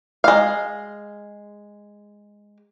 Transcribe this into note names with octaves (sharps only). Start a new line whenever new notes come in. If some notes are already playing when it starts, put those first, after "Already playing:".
G#3 F5